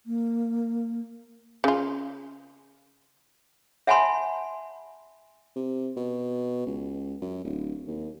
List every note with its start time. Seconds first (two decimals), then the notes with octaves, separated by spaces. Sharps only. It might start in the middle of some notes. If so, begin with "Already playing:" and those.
0.06 A#3
1.64 C#3 F4
3.87 E5 F#5 G#5 A5 B5 C6
5.56 C3
5.97 B2
6.67 C#2
7.21 F#2
7.45 D1
7.87 D#2